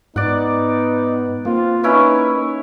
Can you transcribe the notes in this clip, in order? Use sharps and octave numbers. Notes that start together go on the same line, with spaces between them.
G#2 B3 D#4 D5 F#5
A#3 C4 F4
C#4 D#4 E4 B4 C#5